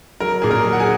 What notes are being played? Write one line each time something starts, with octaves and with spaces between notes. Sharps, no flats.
F#3 A#4
A#2 G#4
A#4
F#3
F#5
G#4 G#5